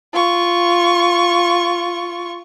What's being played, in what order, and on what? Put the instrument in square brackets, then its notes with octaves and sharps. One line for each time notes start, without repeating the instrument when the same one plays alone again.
[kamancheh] F4 C#6